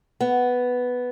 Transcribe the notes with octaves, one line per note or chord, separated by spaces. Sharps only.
B3